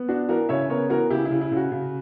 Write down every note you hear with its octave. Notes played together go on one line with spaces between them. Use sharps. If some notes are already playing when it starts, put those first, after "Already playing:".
Already playing: B3
D4 F#4
E3 F#4 A#4
C#3 C#5 E5
B3 A#4 C#5
E3 F#4 A#4
C#3 E4 G4
E4
C#3
E4
C#3 F#4
C#3